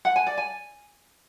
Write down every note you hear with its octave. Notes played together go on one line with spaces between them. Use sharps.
F#5
G#5
D5
G#5